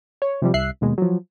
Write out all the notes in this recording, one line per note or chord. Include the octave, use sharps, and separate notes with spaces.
C#5
C3 F3 G3
C2 E5 F#6 C7
D#2 B2 G#3
F3 F#3